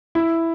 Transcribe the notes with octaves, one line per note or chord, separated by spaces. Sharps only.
E4